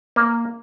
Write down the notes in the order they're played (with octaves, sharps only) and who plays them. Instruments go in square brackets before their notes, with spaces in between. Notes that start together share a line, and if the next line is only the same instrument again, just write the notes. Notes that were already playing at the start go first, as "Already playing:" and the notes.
[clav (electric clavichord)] A#3